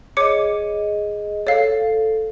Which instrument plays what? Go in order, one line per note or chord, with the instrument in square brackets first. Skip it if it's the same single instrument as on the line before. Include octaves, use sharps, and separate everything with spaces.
[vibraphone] G#4 D#5 [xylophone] C#5 D6 C#7
[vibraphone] A4 [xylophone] C#5 F5